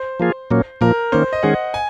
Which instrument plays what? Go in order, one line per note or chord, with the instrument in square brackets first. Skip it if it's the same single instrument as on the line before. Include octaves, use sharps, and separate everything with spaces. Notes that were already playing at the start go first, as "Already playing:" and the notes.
Already playing: [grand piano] C5
[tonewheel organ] F3 A#3 F4 G#4
A#2 F#3 A#3 C#4
[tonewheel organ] A#2 F3 A#3 [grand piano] A#4
[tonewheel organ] D#3 A#3 C#4 [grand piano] C5
[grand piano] D#5
[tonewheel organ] D#3 G#3 C#4 G#4 [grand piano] F#5
[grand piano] G#5